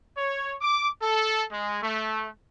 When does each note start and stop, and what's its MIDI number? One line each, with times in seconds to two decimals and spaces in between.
0.17 0.55 73
0.61 0.89 86
1.02 1.43 69
1.52 1.79 56
1.82 2.27 57